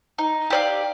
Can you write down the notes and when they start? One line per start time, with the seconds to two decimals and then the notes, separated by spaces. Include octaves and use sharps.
0.18 D#4
0.50 G4 D5 F5